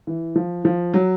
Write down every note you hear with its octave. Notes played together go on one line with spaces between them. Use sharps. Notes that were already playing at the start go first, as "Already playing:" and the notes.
E3
F3
F3
F#3